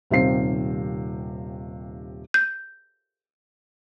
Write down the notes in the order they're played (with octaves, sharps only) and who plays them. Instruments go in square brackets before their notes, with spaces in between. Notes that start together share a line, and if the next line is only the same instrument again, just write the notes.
[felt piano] D#1 C3 D#3 C5 F5 C7
[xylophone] G6